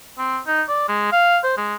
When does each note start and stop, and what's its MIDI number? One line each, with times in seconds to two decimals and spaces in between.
0.18 0.39 60
0.47 0.63 63
0.69 0.88 74
0.89 1.09 56
1.12 1.39 77
1.44 1.54 72
1.58 1.75 56